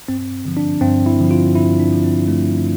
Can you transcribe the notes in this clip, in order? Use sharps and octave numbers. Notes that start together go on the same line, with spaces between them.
G2 C4
D3 F3
D4
G2 C4
E4
D3 F3
F4
G2 E4
D4
D3 F3
C4
G2 A3